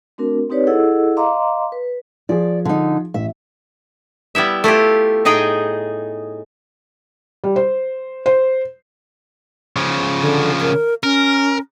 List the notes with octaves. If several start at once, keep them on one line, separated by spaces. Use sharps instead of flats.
A3 C4 D4 F#4 A#4
C4 D#4 G4 B4 C#5 D5
E4 G#4 A4 D#5 F#5 E6
D#5 F5 A#5 C6 D6
B4
F3 G#4 D5
D3 D#4
A1 E5
G3 B3 E4 E5
A3 E4 F4 G4
A2 D#4 G#4 D#5 G5
G3
C5
C5
C#3 F3
D3
A#4
C#4 A#4